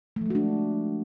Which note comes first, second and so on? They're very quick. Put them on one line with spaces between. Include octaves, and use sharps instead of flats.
A3 F3 G#3 F#4 D4